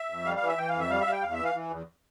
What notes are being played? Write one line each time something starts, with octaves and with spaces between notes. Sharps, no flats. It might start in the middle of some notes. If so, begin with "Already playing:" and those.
Already playing: E5
F2
G3 F5
F5
E3
E5
E3 G5
F5
F2
E5
G3 F5
E5
G3 F5
G5
E2 F5
E5
E3
F5
E3
E2